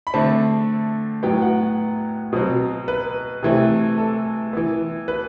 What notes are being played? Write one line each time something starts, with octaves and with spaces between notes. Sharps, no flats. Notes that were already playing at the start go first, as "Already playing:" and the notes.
B5
D3 A3 C4 A5
A2 F#3 B3 G5
F#5
B2 F#3 C4
B4
C3 E3 A3 C4
A4
E3 B3
B4